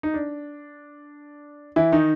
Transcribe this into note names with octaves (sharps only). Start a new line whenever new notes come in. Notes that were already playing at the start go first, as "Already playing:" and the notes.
D#4
D4
E3 E4
D#3 D#4